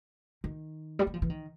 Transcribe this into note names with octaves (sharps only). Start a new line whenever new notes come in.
D#3
G3
F#3
F3
E3
D#3